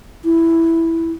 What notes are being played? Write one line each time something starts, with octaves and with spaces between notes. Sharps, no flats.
E4